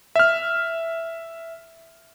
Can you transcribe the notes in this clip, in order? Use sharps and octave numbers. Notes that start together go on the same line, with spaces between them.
E5 F6